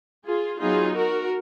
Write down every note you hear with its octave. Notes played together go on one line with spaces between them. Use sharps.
F4 G#4
F#3 B3 D#4 F4 G#4
F#4 A#4